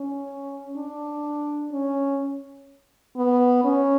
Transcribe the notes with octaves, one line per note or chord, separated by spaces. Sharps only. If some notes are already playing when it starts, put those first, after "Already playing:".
Already playing: C#4
D4
C#4
B3
C#4